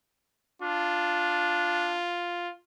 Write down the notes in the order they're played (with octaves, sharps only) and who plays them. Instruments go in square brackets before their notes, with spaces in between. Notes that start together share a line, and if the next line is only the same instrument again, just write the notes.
[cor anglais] D4 [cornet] F4